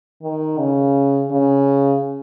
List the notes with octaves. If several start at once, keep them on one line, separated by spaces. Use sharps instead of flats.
D#3
C#3
C#3